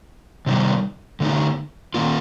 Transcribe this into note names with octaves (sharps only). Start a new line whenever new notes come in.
C3 D#3 G3
D3 A3 D#4
D#3 A#3 F4